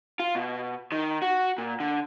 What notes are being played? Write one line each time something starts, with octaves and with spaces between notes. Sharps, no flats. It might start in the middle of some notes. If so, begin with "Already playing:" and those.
F4
B2
D#3
F#4
A#2
D3